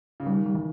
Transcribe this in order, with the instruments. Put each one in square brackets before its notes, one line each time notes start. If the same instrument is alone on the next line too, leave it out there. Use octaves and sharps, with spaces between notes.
[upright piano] C#3
[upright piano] D#3 [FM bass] G3
[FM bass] G3
E3